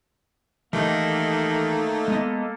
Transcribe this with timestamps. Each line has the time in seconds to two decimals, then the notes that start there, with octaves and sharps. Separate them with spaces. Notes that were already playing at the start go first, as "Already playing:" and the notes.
0.73 D#3 E3 A3 A#3 D#4 G4 A4
2.08 G#3 B3 D#5